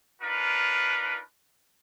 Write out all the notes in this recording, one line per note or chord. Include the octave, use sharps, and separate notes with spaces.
D4 D#4 F4 A#4 B4